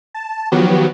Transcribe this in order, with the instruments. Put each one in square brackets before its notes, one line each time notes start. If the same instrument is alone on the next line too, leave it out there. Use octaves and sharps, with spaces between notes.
[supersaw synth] A5
D#3 F3 F#3 B3 F#4 G4